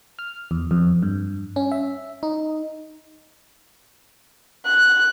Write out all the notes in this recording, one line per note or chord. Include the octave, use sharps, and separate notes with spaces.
F6
E2
F2
G2
C#4
E5
D#4
F#6